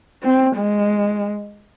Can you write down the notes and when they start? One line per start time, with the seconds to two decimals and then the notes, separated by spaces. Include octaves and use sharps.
0.23 C4
0.56 G#3